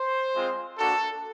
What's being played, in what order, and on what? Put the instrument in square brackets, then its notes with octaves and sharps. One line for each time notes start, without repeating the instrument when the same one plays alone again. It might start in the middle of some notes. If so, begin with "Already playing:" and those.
Already playing: [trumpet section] C5
G#3 C4 F4
A#3 D4 F#4 A4